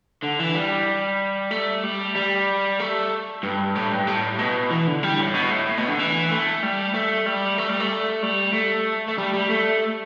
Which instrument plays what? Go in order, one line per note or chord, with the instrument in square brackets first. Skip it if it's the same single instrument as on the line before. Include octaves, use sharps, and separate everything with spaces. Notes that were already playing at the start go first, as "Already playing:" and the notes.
[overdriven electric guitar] D3
E3
G3
A3
G3
G3
A3
G2
A2
G2
A2
B2
E3
D3
G3
A2
B2
A2
A2
B2
D3
E3
A3
G3
A3
G3
A3
G3
A3
G3
A3
A3
G3
G3
A3